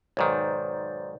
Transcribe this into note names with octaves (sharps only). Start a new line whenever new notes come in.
B1 G#2 D#3 C5 D5